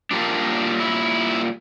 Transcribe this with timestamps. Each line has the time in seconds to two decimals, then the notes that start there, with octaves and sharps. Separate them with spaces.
0.11 A#2 G3 A#3 D4
0.80 E4